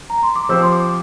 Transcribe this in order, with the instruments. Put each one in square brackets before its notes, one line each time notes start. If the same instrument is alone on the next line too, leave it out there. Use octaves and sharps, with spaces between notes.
[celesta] A#5
C6
D6
[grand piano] F3 C4 G4 C5 [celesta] E6
[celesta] C6
D6